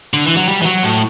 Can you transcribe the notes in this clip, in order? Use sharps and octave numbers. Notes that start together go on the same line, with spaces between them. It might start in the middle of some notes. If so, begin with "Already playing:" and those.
D3
E3
F#3
G3
E3
F#3
A2